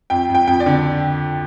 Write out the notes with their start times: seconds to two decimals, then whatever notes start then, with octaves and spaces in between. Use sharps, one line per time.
0.10 F2 G5
0.29 F2
0.35 G5
0.47 F2 G5
0.60 D5
0.66 D3